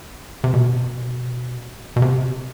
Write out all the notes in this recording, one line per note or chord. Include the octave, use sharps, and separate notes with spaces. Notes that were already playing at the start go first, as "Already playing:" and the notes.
C3
B2
B2
C3